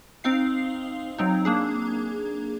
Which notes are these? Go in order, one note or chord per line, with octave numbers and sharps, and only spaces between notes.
C4 D#4 F5 C7
F#3 C4 D#4
A#3 D4 G#4